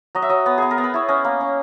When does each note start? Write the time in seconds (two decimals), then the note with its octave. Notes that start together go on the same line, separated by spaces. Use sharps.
0.15 F#3 D#5
0.22 E5
0.29 F#3 D#5
0.46 B3
0.58 B3 G#4
0.71 A#4
0.78 B3
0.84 B4
0.94 E4 C#5
1.08 C#4 D#5
1.25 A#3
1.41 C#4